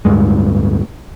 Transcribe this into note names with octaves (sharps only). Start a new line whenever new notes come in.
D1 G#1 G2 G#3